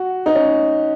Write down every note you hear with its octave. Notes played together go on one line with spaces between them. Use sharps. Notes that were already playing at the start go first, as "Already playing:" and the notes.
Already playing: F#4
D#4
C#4